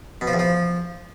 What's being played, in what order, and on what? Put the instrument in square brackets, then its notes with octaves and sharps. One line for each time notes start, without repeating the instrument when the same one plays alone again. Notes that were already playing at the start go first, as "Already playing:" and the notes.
[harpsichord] B2
F3
E2
F3